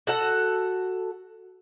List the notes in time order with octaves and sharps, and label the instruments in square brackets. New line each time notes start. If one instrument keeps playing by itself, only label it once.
[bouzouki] F#4 A4 F#5